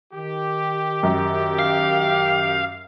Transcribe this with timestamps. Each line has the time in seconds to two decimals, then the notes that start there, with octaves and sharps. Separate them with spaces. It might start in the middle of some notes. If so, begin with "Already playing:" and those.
0.13 D#3 G4
1.03 F#2
1.59 F5